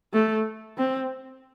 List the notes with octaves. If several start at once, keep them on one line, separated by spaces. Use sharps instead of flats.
A3
C4